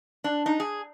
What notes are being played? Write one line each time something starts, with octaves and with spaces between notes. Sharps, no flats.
D4
D#4
G#4